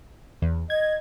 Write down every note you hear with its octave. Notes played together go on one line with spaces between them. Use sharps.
E2
D#5 G#6